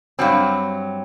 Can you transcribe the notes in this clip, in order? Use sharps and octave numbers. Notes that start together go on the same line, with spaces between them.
G2 F#3 C4